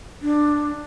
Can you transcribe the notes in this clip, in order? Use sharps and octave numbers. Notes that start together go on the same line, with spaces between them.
D4